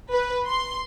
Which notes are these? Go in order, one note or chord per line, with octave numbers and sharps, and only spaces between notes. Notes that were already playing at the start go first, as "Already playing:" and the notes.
B4
C6